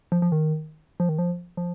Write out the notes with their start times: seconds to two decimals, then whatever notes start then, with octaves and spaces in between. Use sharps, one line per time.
0.12 F3
0.22 F3
0.32 D#3
1.00 F3
1.09 D#3
1.18 F3
1.57 F3